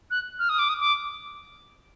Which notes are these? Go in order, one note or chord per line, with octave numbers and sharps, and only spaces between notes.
F#6
F6
D#6
D6
D#6
D6